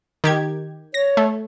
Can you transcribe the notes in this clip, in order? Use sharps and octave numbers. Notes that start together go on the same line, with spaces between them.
D#3 G4 G#6
C#5 A#6
A3